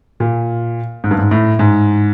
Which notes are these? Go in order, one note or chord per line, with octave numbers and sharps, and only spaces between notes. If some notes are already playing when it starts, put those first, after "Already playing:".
A#2
G#2
G2
G#2
A2
G#2